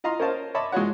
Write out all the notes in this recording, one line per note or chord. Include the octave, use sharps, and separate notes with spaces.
F4 D#5 F5 A#5 C6
C#4 A#4 C5 D#5 F5 A5
C#5 D#5 E5 A5 B5 D6
G#3 F4 F#4 C#5 F#5